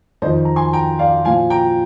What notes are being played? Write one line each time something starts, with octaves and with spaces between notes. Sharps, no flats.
F2 D#3 C5 D#5
A#5
G#5 C6
G5 A#5
D5 F5
A#2 F3 F5 G#5
G5 A#5